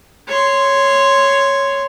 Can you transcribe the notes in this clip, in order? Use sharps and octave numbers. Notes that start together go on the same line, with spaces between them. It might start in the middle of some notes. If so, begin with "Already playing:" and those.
C#5 C6